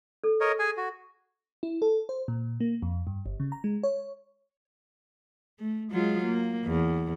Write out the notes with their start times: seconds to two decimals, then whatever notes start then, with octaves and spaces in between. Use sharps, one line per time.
0.24 A4
0.41 A#4 C#5 D#5
0.59 G#4 G#5
0.77 F#4
1.63 E4
1.82 A4
2.09 C5
2.28 A#2
2.60 A#3
2.82 F2
3.07 G2
3.26 G1
3.40 C#3
3.52 A#5
3.64 G#3
3.83 C#5
5.59 A3
5.91 F#3 G#3 F4
6.25 A#3
6.64 E2